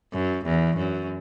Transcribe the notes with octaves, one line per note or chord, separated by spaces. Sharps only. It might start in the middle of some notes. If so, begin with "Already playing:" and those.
F#2
E2
F#2